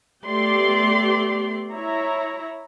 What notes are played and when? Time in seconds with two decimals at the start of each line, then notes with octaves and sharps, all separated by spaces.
0.25 A3 B3 G4 D5 C6
1.71 E4 C#5 A#5